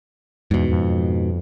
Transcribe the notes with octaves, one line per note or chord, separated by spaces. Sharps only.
E2 G#2 B2
F2